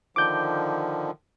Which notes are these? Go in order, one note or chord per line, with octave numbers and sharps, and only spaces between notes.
D3 D#3 F3 D6 G6